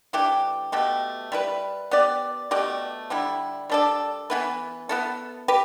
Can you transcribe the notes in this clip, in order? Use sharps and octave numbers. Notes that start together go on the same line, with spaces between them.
E3 A3 D4 G4
B2 A3 G4
G3 E4 B4
B3 G4 D5
B2 A3 G4 D5
D3 G3 E4
G3 D4 A4 D5
E3 B3 E4 B4
B3 E4 A4
G4 B4